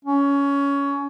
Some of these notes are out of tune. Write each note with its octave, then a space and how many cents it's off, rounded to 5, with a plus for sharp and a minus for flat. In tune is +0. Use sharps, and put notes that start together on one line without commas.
C#4 +20